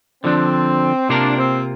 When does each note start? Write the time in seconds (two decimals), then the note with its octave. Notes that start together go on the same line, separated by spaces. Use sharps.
0.23 D3 F3 C4 D4
1.09 C3 A#3 D4 F4 A#4
1.37 C4